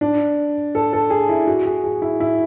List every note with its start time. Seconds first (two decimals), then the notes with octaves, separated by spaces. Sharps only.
0.01 D4
0.75 A4
0.93 A4
1.10 G#4
1.29 E4
1.47 F#4
1.65 G#4
1.84 G#4
2.02 E4
2.20 E4